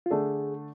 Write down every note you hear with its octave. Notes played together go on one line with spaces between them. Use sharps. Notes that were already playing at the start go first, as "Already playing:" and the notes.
F4
D3 A3 D4 G#4 A4